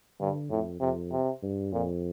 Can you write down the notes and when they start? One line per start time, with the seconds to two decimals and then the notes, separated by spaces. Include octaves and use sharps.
0.20 G2 D3
0.51 F2 A2
0.81 F2 C3
1.12 C3
1.42 G2
1.73 F2 A#2